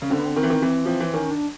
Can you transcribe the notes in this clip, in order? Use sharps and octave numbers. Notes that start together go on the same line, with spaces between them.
C#3
D3 C4
B3
C4
D#3 C4
E3
D#3
E3 C4
F3 C4
E3
D#3 C#4
D4